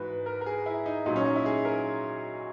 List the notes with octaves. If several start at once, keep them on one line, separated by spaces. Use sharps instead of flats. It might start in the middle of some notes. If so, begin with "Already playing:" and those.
Already playing: G#2 E3 F#4 B4
A#4
A#4
G#4
E4
D#4
A#2 F#3 D#4
C#4
D#4
E4
G#4
A#4